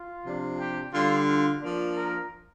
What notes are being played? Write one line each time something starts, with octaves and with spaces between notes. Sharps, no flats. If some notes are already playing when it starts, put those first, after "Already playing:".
Already playing: F4
C3 F3 D4
G4
D3 G3 D4 F4
F4
F3 A#3 D4
A#4